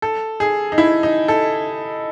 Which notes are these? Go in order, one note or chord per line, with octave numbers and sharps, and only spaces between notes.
A4
G#4
D#4
E4
D#4
A4